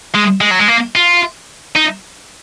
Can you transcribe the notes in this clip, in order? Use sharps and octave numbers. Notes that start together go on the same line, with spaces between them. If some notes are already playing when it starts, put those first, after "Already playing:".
G#3
G#3
F#3
G#3
A#3
F4
D#4